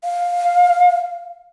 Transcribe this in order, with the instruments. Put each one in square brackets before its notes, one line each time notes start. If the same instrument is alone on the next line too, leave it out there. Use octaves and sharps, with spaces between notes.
[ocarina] F5